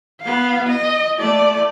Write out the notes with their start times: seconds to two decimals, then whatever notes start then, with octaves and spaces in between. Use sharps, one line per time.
0.22 B3 F5
0.67 D#5
1.19 A3 D5